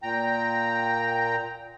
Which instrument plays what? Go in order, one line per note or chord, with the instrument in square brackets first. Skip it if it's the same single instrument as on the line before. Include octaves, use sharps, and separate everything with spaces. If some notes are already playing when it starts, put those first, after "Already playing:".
[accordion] A#2 G5 A#5